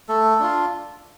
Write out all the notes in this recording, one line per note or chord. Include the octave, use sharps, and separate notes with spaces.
A3 A4
D4 F4